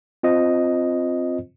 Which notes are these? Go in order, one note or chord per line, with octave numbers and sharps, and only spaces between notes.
C4 F4 C5 D#5